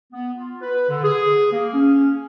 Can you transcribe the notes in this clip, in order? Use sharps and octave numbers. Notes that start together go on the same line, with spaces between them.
B3
F4
B4
D3
G#4
A#3
C#4